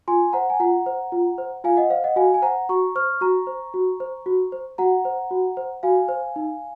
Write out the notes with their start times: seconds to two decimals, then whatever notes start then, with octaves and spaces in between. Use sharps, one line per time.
0.08 F4 G#5 C6
0.33 C5 F#5 A#5
0.50 G#5
0.60 F4 F#5 A#5
0.86 C5
1.12 F4
1.38 C5
1.64 F4 F5 G#5
1.77 D#5 F#5
1.90 C5 F5
2.04 D#5 F#5
2.16 F#4 F5 G#5
2.34 G#5
2.42 C5 F#5 A#5
2.69 F#4 A#5 C#6
2.95 C5 C#6 F6
3.21 F#4 A#5 C#6
3.47 C5
3.74 F#4
4.00 C5
4.26 F#4
4.52 C5
4.78 F#4 F#5 A#5
5.05 C5
5.31 F#4
5.57 C5
5.83 F#4 F5 G#5
6.09 C5
6.36 D#4